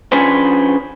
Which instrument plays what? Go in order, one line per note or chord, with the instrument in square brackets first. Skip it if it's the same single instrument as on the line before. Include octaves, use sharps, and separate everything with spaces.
[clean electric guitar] F3 C#4 D4 G#4 B4 C5